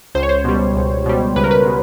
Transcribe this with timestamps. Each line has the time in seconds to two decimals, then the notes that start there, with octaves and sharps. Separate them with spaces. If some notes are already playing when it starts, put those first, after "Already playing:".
0.15 C#2 C5
0.23 C#5
0.29 C5
0.44 B2 G3
0.76 C#2
1.06 B2 G3
1.36 C#2 B4
1.44 A#4
1.51 B4
1.66 B2